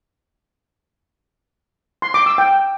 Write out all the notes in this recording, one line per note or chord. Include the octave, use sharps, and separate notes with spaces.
C6
D6
E6
G5